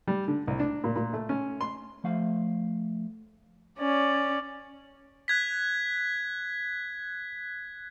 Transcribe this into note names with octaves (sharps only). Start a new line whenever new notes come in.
G3
D3
C2
D4
A#2
A#2
A3
C#4
C6
F3 A3 F5
C#4 D5
F#6 G#6 B6